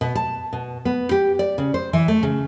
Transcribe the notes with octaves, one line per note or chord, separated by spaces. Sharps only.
B2
A5
B2
B3
G4
D5
C#3
C5
E3
A3
C#3